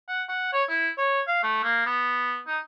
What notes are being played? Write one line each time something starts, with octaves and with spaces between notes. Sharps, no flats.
F#5
F#5
C#5
E4
C#5
F5
A3
A#3
B3
D#4